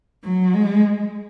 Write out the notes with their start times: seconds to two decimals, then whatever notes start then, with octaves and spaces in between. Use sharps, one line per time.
0.23 F#3
0.54 G#3